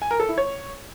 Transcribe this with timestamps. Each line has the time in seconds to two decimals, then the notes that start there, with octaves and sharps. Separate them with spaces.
0.02 G#5
0.11 A#4
0.20 A4
0.29 E4
0.38 C#5